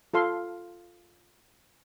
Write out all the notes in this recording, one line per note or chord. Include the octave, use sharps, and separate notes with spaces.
F4 A4 F5 C6